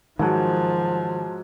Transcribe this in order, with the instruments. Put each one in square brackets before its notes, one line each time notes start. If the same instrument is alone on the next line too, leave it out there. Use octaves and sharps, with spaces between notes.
[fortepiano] G#2 F#3 [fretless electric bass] D#3 [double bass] F3 [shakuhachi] A5